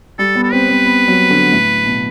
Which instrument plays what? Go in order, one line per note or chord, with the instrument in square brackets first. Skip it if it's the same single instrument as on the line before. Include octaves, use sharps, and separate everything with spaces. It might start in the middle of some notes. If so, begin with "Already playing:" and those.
[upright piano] G3 [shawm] A4
[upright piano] B3
[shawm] A4
[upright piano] C4 [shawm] B4
[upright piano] C4
B3
F#3
D3
A2
B2